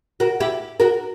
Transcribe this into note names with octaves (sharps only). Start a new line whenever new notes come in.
F#4 A#4
E4 G4
F#4 A#4